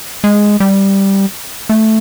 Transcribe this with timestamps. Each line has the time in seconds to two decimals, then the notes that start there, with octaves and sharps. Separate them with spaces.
0.24 G#3
0.60 G3
1.69 A3